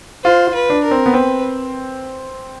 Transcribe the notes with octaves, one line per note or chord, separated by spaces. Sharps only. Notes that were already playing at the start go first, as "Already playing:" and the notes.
F4 C5
F4
B4
D4
A#4
C4
B3
C4 B4